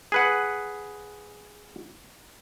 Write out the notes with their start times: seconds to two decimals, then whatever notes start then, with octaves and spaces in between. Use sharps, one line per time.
0.12 G#4 B4 F#5